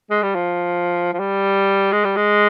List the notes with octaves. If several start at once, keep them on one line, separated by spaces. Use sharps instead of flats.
G#3
G3
F3
F3
G3
G#3
G3
G#3